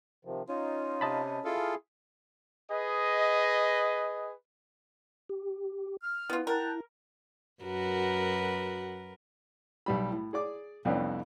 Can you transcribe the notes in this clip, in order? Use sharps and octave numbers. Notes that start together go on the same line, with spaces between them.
C3 D#3 F3
C#4 D#4 F4
C3 D#5 A5 B5
E4 F4 G#4 A4 F5
G#4 B4 D#5
G4
F6
B3 E4 F4
A#4 F#5 G5 A5
F#2 F#4 A#4 B4
B1 G3 B5
A2
G#4 D5 D6
C2 F2 B3 C#4 D4 B4